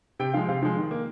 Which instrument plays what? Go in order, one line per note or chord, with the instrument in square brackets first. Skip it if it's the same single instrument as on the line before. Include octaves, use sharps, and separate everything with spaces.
[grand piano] C3 G5
F3 G#3 F5
C3 F5
F3 G#3
D#3
A#3